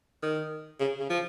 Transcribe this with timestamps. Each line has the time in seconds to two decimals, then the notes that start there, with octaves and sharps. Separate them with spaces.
0.23 D#3
0.80 C#3
1.00 C#3
1.10 F3